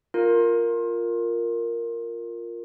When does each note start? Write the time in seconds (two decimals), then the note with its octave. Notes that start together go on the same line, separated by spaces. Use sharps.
0.14 F4 A#4